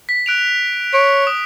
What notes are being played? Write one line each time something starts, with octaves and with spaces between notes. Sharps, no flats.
B6
F#6 D7 F7
C#5 D7
D#6